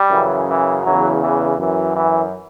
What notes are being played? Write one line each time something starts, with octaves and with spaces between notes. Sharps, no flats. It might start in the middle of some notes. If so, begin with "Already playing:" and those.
Already playing: G3
F#2 C#3 E3
E3
E2 C#3 E3 F#3
E3
F#2 E3
E3